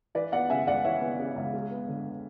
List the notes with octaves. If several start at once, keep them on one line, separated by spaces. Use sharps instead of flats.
E3 B4 D5
B3 D5 F#5
C#3 E5 G#5
C#2 D5 F#5
E3 C#5 E5
B3
C#3
C#2
G#3
B3
D3